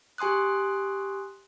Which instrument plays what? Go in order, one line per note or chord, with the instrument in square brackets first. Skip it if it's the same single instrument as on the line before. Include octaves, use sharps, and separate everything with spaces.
[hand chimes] G4 G#5 C6 D#6 F#6